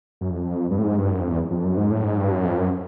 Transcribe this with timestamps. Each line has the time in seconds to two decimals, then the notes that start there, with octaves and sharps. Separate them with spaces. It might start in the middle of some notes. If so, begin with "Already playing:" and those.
0.21 F#2
0.30 F2
0.71 G2
0.79 A2
0.84 G#2
0.98 G2
1.10 F#2
1.20 F2
1.30 E2
1.51 F2
1.64 F#2
1.77 G#2
1.91 A2
2.04 G#2
2.17 G2
2.32 F#2
2.45 F2
2.58 F#2